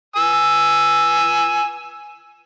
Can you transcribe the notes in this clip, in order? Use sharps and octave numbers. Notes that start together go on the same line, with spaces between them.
G#5 E6